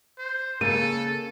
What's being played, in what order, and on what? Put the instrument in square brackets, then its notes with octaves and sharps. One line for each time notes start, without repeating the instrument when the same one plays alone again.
[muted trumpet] C5
[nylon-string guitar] C#3 A#3 [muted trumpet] A4 [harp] D#7